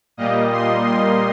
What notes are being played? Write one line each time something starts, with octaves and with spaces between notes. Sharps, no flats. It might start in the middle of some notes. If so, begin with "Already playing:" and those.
A#2 G3 A#3 D#5
C6
C6